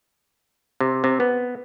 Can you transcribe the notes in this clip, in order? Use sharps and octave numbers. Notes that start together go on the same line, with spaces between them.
C3
C3
B3